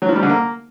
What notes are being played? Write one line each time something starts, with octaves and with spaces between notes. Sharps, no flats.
F#3
F3
G3
D3
A#3